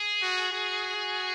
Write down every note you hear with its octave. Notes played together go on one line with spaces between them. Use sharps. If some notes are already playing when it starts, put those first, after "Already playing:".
Already playing: G#4
F#4
F#4
F#4